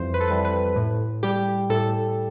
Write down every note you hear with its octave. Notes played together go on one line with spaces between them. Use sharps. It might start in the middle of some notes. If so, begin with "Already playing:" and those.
Already playing: F2 E3 G3 C5
B4
A4
E3 G3 B4
B4
A2
G3 G4
A2 A4